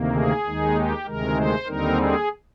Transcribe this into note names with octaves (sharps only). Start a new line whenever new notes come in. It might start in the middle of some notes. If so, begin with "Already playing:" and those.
Already playing: D2 C3 D#3 A#3
G#4
D#2 D#3 G#3 D#4
G4
D2 C3 D#3 G#3 A#4
C5
D#2 D3 G3 C4 D#4 A#4
G#4